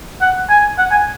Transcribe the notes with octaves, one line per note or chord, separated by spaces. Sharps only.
F#5
G#5
F#5
G#5